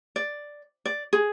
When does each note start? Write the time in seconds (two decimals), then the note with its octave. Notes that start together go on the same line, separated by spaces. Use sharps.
0.16 D5
0.85 D5
1.13 G#4